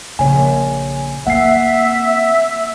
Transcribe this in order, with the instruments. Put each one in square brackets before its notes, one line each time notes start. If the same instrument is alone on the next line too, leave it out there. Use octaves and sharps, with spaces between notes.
[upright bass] A#1 C#3 [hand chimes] C#5 G#5
[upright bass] A#3 C4 [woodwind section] E5 [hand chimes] F#5 C7